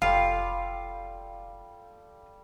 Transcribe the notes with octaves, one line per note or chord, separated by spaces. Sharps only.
F1 G3 F4 A4 F5